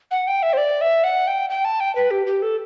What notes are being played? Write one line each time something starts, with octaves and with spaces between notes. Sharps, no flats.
F#5
G5
E5
C5
D5
E5
F#5
G5
G5
A5
G5
B4
G4
G4
A4